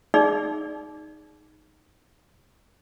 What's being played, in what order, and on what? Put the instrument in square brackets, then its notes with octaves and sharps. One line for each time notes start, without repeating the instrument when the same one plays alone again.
[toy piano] D#4 G#4 D5